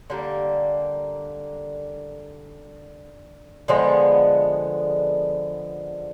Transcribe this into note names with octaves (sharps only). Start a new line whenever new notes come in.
D3 G3 A#3
D3 F3 G#3 B3